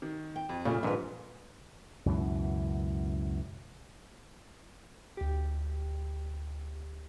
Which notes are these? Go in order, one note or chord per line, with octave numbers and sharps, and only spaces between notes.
D#3
G5
F2
A#2 C#3 G3 A3 F4
A#1 G#2 D#3 B4
C#2 F#2 B2 E3
D2 G4